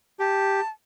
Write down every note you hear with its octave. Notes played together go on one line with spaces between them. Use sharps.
G4 A5